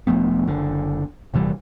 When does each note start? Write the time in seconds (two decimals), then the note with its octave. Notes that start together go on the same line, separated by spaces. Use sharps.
0.07 E1 F3 A3 B3
0.47 F#1 D3
1.34 D#1 C3 E3 G3